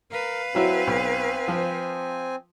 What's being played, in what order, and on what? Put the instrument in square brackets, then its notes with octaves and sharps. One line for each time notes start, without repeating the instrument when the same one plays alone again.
[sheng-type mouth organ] A#4 [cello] B4 F5
[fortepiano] F#3 E4 F#4 [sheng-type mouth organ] C4 G#5
[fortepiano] B1
F3